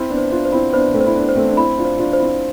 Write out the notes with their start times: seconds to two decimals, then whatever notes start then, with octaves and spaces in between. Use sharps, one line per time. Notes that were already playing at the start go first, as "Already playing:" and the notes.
Already playing: C4 E4 C5
0.10 B3 D4
0.18 C5
0.32 D4 F4
0.45 C5
0.52 C4 E4
0.73 B3 D4 C5
0.94 A3 C4
1.01 C5
1.06 E4
1.15 B3 D4
1.29 C5
1.35 A3 C4
1.48 D4
1.57 C4 E4 B5
1.77 D4 F4
1.85 C5
1.99 D4 F4
2.13 C5
2.20 C4 E4